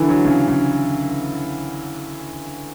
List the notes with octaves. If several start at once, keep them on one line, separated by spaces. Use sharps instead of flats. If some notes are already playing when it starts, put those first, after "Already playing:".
Already playing: D3 E3
F#3
C#3
C#3